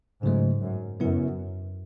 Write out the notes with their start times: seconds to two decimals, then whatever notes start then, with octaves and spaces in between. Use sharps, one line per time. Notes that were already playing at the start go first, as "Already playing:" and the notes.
0.23 G#2 C#3 F#3 A3
0.62 F#2
0.99 F#2 C#3 F#3 B3 E4 B4